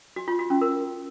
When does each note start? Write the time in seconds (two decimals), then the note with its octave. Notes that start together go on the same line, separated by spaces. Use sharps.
0.16 F#4
0.28 F4
0.39 F#4
0.50 C#4
0.61 A#4